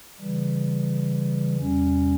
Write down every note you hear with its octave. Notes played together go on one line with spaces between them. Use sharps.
C#3 E3 G3
E2 C3 G3 C#4